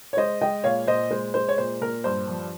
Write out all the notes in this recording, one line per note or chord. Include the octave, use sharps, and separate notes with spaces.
C#5
G#3 C5 D#5
G#3 D#5 G5
A#2 C#5 F5
A#2 C5 D#5
G#3 C5
G#3 C5
C#5
A#2 C5
A#2 A#4
G2 C5
F3